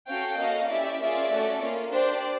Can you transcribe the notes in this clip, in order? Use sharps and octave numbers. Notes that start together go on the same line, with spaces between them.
C#4 F#4 A4 F5 G5
A#3 C#4 F#4 A4 D#5 F5
C#4 E4 G4 D5 E5
A#3 C#4 F4 G#4 D5 E5
A3 C#4 F#4 A4
A#3 C#4 F4
D4 G4 C5 D5